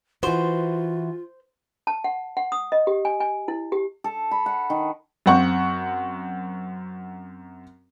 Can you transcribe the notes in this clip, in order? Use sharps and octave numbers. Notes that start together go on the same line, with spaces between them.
E3 F4 F#4 C5
A5
F#5
F#5
D#6
D#5
G4
G#5
G#5
E4
G4
A4
B5
F#5
D#3
F#2 C4 F#5 C#6